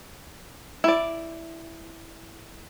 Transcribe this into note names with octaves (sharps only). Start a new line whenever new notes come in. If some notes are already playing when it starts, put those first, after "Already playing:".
E4 D5